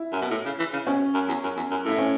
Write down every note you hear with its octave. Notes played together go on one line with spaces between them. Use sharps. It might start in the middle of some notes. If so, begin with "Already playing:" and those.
Already playing: E4
F#2
B2
A2
C#3
E3
C#3
B2 C#4
F#2
E2
F#2
E2
F#2
A2 E4
C#4